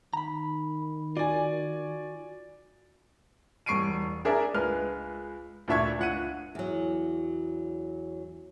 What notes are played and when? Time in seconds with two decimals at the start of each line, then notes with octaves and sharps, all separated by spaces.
0.13 D#3 A#5 B5
1.17 F4 F#4 D5 G#5
3.66 E1 G3 C#6 C7 D7 D#7
4.25 D4 G#4 A#4 D5 E5
4.54 C#2 G#3 B4 F6
5.68 D2 A#2 D4 E5 C#6 G#6
5.99 C#2 F#5 D#7
6.55 E2 F#3